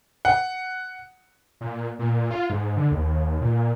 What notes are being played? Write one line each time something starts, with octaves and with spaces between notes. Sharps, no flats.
F#5
A#2
A#2
F4
G#2
D3
D#2
A#2